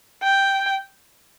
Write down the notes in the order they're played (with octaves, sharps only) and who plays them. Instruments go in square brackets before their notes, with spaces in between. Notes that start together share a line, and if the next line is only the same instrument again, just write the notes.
[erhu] G5